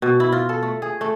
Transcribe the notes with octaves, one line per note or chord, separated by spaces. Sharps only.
B2
E4
F4
A4
A3
G#4
A3